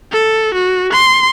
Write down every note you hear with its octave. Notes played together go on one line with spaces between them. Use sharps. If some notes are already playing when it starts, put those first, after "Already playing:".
A4
F#4
C6